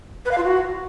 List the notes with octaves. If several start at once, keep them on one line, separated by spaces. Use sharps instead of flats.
B4
F5
F4
F#4